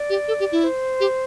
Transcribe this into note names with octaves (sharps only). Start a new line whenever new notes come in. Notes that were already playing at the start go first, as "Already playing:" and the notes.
Already playing: D5
G4
A4
G4
E4
C5
G4